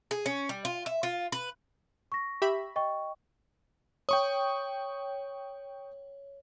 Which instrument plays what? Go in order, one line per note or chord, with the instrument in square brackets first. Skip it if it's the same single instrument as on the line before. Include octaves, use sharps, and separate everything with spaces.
[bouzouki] G#4
C#4
G3
F4
E5
F4
B4
[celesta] C#6 A#6
[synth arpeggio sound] G4 E5 B5
[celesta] D#5 G5 C#6
[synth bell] C#5 [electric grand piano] G5 C#6 D#6